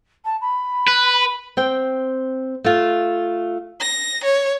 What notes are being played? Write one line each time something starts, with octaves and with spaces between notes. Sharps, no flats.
A5
B5
B4
C4 G5
A3 F4
A#6
C#5